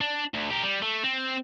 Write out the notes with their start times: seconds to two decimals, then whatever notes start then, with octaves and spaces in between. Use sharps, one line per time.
0.01 D4
0.34 D2
0.50 G4 A#4
0.63 G3
0.82 A3
1.04 C4